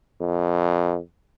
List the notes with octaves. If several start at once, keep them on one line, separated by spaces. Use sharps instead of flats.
F2